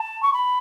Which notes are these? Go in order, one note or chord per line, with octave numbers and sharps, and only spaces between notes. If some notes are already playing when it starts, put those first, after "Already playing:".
Already playing: A5
C#6
B5